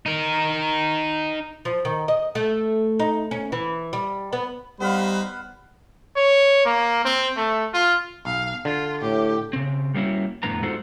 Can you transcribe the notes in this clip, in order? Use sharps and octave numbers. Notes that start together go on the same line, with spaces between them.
D#4 A#4
F3
D#3
D#5
A3
D#4
C#4
E3
G3
B3
G3 B3 D#4 B4 C5 F5 B5
C#5
A#3
C4
A3
F4
B1 F5
D3 F4
A2 G4
C#3 C4
G3 A#3 C#4 D#4 E4 F#4
F2 A2 D3 B3 A#5
G#3 D#4 F4 F#4 A4 C5